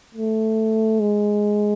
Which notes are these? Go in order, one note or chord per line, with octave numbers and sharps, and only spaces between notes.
A3
G#3